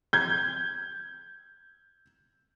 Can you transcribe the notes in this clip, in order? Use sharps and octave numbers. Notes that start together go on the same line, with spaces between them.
G6 G#6